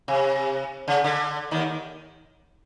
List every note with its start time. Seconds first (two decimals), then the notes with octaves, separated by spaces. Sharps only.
0.08 C3
0.88 C#3
1.04 D3
1.51 D#2 D#3